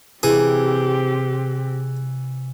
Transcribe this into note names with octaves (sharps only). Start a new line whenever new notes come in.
C3 E3 C4 G4 G#4